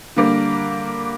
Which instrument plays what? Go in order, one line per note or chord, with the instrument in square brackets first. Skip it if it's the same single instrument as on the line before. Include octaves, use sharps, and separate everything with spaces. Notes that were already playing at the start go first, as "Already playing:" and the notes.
[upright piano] D3 G3 A#3